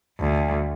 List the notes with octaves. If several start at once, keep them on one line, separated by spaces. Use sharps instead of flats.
D2